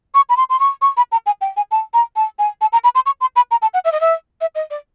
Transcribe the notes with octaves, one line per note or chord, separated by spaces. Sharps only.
C#6
B5
C6
C6
C#6
C#6
B5
A#5
G#5
G5
G#5
A5
A#5
A5
G#5
A5
A#5
B5
C6
C#6
C6
B5
A#5
A5
F#5
E5
D#5
E5
E5
D#5
D5